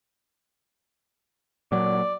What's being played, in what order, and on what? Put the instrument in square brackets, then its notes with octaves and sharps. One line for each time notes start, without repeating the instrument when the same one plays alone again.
[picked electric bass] A#2 F#3 [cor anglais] D5